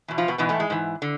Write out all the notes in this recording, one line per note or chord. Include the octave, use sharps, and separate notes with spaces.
E2 B2
F3 F4
B2 B3
G#2 B2 E3 B3
A2 A3
G#3
G#2 E3
D3